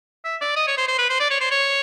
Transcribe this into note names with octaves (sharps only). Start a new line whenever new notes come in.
E5
D5
D#5
C#5
C5
C5
B4
C5
D5
C#5
C5
C#5